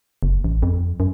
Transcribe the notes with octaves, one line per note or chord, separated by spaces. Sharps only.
F#1
A1
F2
F#2